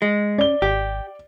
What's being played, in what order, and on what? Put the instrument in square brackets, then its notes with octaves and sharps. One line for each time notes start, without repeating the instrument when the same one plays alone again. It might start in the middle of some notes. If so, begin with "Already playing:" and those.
[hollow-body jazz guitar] G#3
[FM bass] C#4 [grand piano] D5 G7
[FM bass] G#1 [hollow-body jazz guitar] G4